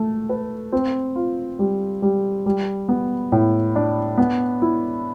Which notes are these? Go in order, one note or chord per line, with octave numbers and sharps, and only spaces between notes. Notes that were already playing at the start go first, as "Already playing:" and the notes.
Already playing: A3
B4
C4
F4
G3
G3
G3
B3
A2
D4
B3
E4